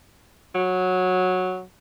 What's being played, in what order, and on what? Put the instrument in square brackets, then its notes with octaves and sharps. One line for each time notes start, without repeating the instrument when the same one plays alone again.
[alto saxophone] F#3